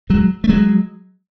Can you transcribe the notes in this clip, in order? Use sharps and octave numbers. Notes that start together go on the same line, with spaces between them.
F#3 G#3
A3
F#3 G#3